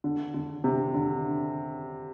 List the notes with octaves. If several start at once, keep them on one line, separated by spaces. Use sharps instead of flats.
D3
D3
C3
D3